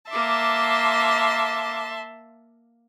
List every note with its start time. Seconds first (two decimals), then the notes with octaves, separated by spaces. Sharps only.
0.11 A#3 E5 A5 C6 D6